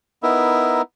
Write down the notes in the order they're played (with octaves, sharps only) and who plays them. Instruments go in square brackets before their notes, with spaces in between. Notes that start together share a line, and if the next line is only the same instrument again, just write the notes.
[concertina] B3 D#4 E4 A#4 E5